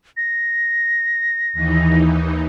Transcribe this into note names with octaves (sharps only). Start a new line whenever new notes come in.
A#6
D#2 E3 D#4